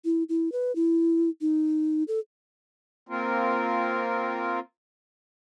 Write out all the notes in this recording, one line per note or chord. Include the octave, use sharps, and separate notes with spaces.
E4
E4
B4
E4
D#4
A4
A#3 C4 F4 A#4